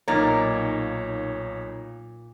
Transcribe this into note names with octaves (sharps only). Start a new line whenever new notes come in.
B1 A#2 D#4 A#4 C#5